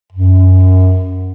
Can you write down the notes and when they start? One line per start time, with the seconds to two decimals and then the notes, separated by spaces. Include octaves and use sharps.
0.13 F#2